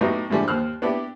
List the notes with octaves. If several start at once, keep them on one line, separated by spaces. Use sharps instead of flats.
A2 F#3 B3 D#4 G4
G#2 D3 E3 F3 G3 A3
D#2 C5 F6 F#6
B3 D4 E4 G4